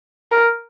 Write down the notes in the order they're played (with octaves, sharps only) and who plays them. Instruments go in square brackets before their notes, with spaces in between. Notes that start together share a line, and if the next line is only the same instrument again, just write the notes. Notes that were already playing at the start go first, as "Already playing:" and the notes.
[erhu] A#4